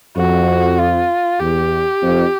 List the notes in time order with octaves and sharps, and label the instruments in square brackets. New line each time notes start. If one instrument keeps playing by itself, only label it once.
[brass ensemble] F2 [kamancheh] F#4
[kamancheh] F4
[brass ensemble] E2 [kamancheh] G4
[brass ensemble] F2